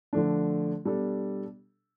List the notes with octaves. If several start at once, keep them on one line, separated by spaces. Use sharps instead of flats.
D3 F3 A3 D4
B2 G3 D4 A4